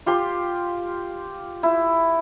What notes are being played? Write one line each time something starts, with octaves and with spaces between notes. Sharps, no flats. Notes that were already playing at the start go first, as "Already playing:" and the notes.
F4 G4 C6
E4